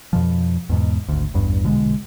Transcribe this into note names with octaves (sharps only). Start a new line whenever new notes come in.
F2 B2 F3
E2 G#2 B2
G#1 D2
A1 E2 G2
A#1 B2 D3 G#3